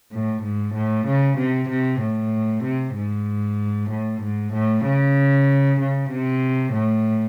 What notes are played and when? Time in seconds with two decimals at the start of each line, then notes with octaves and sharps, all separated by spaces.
0.12 A2
0.43 G#2
0.74 A2
1.06 C#3
1.37 C3
1.69 C3
2.01 A2
2.64 C3
2.95 G#2
3.90 A2
4.22 G#2
4.53 A2
4.85 C#3
5.80 C#3
6.10 C3
6.74 A2